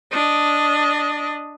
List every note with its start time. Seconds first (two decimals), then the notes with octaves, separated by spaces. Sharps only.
0.12 D4 D#5